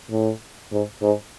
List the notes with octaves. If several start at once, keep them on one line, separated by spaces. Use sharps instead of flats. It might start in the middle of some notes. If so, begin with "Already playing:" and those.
A2
G#2
G#2